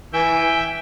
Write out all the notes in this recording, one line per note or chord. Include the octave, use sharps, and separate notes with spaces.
E3 E5 G5 G#5